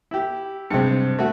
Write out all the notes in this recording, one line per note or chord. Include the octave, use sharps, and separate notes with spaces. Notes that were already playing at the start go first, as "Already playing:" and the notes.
E4 G4
G2 C3 F#3 G#3 C4 C#7
A3 F#4